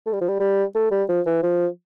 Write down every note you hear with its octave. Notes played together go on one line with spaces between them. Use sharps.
A3
G3
F3
G3
G3
A3
G3
F3
E3
F3